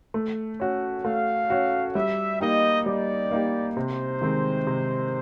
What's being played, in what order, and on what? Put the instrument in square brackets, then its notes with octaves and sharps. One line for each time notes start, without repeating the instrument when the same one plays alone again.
[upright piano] A3
C#4 F#4
[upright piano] A3 [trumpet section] F5
[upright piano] C#4 F#4
[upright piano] G3 [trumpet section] E5
[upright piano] A#3 D#4 G4 [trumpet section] D#5
[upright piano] G3 [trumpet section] D5
[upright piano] A#3 D#4 G4
[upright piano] C3 [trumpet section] C5
[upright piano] D#3 G#3 C4
C3